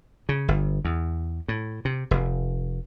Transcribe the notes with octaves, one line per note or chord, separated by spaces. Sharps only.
C#3
G1
E2
A2
C3
F1